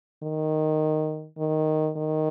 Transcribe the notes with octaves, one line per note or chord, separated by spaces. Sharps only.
D#3
D#3
D#3